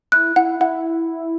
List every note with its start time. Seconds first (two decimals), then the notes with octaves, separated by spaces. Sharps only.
0.12 E4 F#6
0.36 E4 F#5
0.60 E4 F#5